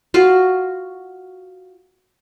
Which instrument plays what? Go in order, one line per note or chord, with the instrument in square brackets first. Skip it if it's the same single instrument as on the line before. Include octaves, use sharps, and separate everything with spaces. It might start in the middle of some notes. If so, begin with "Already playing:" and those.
[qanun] F4 F#4 F5